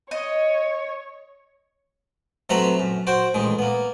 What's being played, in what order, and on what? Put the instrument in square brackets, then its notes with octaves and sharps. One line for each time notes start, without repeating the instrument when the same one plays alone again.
[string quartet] C#5 [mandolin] D#5
[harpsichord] C3 F#3 A3 B4 A#5 B5
F#2
F#4 C5 G5
A1 D#3 G#3
A#3 B3